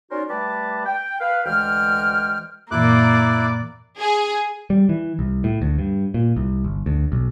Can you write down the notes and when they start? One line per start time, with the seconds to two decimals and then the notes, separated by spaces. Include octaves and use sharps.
0.11 C#4 D#4 F#4 A#4 C5 D5
0.29 G3 A3 B4 A5 B5 D6
0.86 G5
1.20 B4 F5
1.46 D2 E3 G#3 G5 F6
2.71 F#2 A#2 E3 A#3 E4 D5 D6 F#6
3.99 G#4
4.70 G3
4.89 E3
5.19 C2
5.44 A2
5.62 D2
5.79 G2
6.14 A#2
6.36 C2
6.64 G1
6.86 D2
7.12 B1